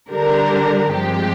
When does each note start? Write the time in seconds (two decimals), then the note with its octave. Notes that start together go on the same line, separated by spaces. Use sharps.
0.11 D3 G3 D4 G4 A#4
0.91 G2 F3 G#3 C4 G4